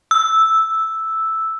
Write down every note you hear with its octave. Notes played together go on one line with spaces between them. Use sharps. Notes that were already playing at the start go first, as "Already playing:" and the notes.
E6